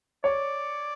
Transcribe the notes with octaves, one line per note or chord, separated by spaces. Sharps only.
C#5 D5